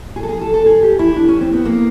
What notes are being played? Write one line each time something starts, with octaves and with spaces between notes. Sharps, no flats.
G#4
A4
G#4
A4
A4
G#4
G4
E4
D4
C#4
C4
B3
A#3